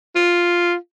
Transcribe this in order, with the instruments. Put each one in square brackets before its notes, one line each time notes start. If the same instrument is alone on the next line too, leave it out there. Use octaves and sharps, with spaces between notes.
[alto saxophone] F4